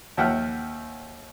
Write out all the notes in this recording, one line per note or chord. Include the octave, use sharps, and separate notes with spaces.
D#2 E5 F#5 G5 F6 F#6